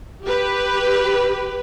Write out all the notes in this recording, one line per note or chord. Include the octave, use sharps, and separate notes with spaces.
G4 B4